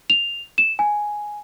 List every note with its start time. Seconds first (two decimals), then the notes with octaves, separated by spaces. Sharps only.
0.10 F7
0.58 E7
0.79 G#5